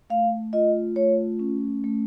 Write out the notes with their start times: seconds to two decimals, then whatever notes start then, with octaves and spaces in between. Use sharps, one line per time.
0.10 A3 F5
0.53 F4 D#5
0.96 A3 C#5
1.39 C#4
1.84 A3